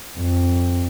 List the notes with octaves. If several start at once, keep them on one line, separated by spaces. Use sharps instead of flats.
F2